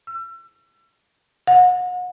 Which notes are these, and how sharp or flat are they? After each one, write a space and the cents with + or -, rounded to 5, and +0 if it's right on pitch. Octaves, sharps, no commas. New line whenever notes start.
E6 +40
F#5 -35